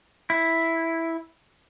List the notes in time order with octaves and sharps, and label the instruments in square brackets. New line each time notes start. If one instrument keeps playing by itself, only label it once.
[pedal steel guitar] E4